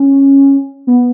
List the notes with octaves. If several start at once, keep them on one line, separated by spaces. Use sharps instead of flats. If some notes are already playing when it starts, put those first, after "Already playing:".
Already playing: C#4
B3